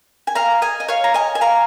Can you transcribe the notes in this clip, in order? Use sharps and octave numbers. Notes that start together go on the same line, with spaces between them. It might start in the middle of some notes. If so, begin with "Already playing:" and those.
G#5
F5 A#5
D#5 G#5
D#5
C#5 F5
A#5
D#5 G#5
G#5
F5 A#5